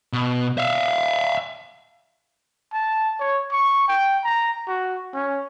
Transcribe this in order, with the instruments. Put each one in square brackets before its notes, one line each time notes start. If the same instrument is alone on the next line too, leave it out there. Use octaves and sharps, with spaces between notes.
[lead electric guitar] B2
E5 F5
[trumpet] A5
C#5
C#6
G5
A#5
F#4
C#4